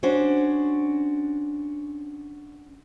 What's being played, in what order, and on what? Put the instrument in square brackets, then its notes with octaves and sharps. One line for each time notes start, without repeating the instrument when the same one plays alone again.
[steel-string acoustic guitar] C#4 D4 F#4 C5